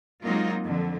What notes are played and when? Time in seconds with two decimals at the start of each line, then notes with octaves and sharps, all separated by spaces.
0.23 F#3 G#3 A#3 C4 D#4 F4
0.62 F2 D3